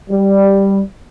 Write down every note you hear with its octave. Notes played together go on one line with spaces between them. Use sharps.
G3